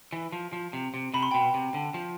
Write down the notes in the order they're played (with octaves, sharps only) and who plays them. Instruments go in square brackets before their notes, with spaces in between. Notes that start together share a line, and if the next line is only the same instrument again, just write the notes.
[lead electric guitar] E3
F3
F3
C3
C3
[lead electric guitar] C3 [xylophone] B5
[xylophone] C6
[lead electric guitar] B2 [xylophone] G5 B5
[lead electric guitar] C3
D3
F3